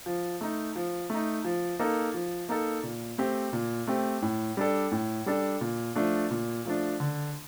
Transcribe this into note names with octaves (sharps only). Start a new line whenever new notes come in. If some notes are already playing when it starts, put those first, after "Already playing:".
F3
A3 D#4
F3
A3 D#4
F3
A#3 D#4 A4
F3
A#3 D#4 A4
A#2
A3 C4 G4
A#2
A3 C4 G4
A2
G3 D4 A4
A2
G3 D4 A4
A#2
F3 A3 D4
A#2
F3 A3 D4
D3